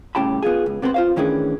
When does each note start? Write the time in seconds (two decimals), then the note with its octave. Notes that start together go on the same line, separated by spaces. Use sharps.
0.15 C2 A2 C#3 G4 A5 B5
0.42 B3 F4 G#4
0.66 C#2
0.82 C3 B3 C4 A#4 C5
0.94 F4 C5 F5
1.16 A2 D#3 E3 C#4 D4 G#4